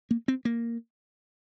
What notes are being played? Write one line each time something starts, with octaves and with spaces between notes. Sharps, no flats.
A#3
C4
A#3